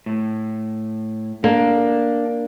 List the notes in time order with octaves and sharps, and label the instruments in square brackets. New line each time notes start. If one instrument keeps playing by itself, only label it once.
[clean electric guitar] A2
[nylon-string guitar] A#3 [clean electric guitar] D4